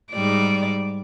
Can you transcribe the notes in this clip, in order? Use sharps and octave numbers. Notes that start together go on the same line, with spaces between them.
G#2 G3 D5